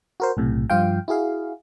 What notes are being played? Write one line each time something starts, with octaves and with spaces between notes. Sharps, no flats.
F#4 A#4 C5
B1 A2 C3
G2 F3 F4 F5 G5
E4 F#4 G#4 F5